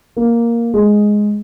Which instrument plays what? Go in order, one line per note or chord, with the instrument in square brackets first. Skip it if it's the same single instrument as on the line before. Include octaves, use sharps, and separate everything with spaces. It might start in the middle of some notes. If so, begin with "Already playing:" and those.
[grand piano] A#3
G#3